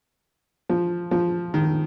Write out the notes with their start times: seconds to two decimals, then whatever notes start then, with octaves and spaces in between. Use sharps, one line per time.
0.69 F3
1.11 F3
1.54 D#3